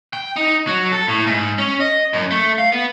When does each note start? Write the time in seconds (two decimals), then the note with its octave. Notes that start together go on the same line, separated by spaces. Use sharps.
0.13 G5
0.36 D#4
0.67 F#3
0.92 A4
1.08 A2
1.26 G#2
1.58 C#4
1.80 D#5
2.13 F#2
2.31 A3
2.58 F5
2.72 B3